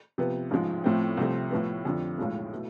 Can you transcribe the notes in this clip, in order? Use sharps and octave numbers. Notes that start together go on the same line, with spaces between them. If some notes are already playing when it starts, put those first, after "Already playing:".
C3 F3 B3
A1 G#2 F3 G#3
A2 F3 A3 C4
C2 C3 F3 A3 C4
A2 F3 B3
F2 D3 F3
B1 A2 F3 G#3
B2 A3 E4